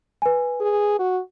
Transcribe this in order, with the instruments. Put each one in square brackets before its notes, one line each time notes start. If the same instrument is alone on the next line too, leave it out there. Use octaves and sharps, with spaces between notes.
[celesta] B4 G#5
[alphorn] G#4
F#4